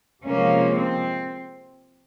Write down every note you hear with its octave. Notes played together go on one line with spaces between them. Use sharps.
C3 F3 G#3 A#3 C#4
C4